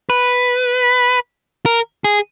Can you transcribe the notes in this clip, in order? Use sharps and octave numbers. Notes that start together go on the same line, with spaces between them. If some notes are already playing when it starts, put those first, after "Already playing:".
B4
A#4
G#4